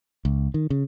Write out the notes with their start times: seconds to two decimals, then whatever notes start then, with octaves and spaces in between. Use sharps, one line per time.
0.25 C#2
0.54 D#3
0.70 C#3